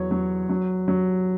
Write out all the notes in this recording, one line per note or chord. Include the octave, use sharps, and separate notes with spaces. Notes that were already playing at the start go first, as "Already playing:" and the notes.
Already playing: E2 F#3 C#5
F#3
F#3
F#3